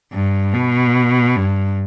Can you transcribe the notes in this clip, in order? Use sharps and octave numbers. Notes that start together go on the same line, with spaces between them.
G2
B2
G2